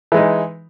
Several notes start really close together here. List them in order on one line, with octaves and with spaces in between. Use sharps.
E3 G#3 D#4